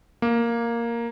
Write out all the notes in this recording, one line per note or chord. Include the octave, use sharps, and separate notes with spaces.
A#3